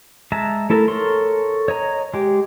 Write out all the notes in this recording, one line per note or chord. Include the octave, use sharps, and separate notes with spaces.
G#3 E5 A5 A#5
A3 E4 A4 A#4
A4 A#4 C#5 C6
C#5 D#5 A#5
G#3 G4